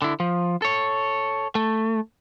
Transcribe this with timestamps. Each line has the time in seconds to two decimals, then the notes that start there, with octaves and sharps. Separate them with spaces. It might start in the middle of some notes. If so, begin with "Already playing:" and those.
0.02 D3 E4
0.20 F3
0.62 A4 C#5
1.55 A3